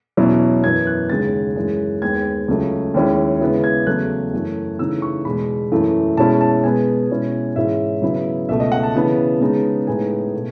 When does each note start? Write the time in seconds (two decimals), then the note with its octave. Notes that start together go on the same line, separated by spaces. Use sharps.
0.17 E2 B2 F#3 C#4 E4
0.64 F#2 E3 B3 G#6
0.87 F#6
1.09 D#2 C#3 G#3 D#4 A6
1.56 F#2 E3 G#3
2.02 D#2 D#3 G#3 B3 G#6
2.48 C#2 C#3 F#3 A3
2.94 D#2 D#3 G#3 C#4 E4
3.41 C#3 G#3 B3 E4
3.64 G#6
3.87 E2 C#3 F#3 A3 F#6
4.33 F#2 E3 A3
4.79 C#3 E3 A3 D#4 E6
5.02 C#6
5.25 E2 B2 G#3 B5
5.72 F#2 E3 A3 E4
6.17 B2 G#3 C#4 E4 A5
6.41 A5
6.64 B2 G#3 B3 G#5
7.10 B2 G#3 C#4 E4
7.56 G#2 E3 G#3 C#4 E4 E5
8.02 C#3 F#3 B3 E4
8.49 C#2 B2 A3 E5
8.60 D#5
8.72 F#5
8.83 A5
8.95 C#3 E3 B3
9.41 C#3 G#3 B3 D#4
9.87 A2 G#3 B3 D#4 G#5
10.34 B2 A3